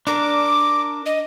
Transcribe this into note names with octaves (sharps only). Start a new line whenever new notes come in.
D4 A#4 D6
D#5